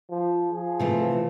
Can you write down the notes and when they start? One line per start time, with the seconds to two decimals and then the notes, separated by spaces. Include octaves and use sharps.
0.10 F3
0.51 F3 G#4
0.79 C3 E3 A3